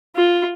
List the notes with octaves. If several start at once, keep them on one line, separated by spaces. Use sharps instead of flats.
F4